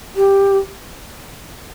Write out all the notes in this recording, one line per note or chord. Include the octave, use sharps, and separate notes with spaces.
G4